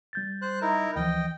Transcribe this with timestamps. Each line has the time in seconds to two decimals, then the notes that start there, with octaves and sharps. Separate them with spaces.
0.13 G3 G6 A6
0.42 C5 F#6
0.62 D#4 E4 A#4
0.96 D2 E3 F3 D#5 G5